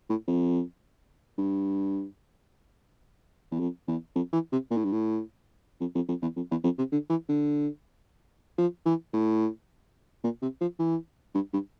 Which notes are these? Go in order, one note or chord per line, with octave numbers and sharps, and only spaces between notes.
A2
F2
G2
E2
F2
E2
F2
E3
C3
A#2
A2
G2
A2
F2
F2
F2
E2
F2
E2
F2
C3
D3
E3
D3
F3
E3
A2
A#2
C3
F3
E3
G2
G2